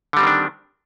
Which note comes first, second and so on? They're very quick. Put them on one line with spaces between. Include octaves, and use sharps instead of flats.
D3 G3 C4 D#3 D4